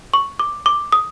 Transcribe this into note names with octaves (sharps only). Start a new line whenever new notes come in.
C#6
D6
D6
D#6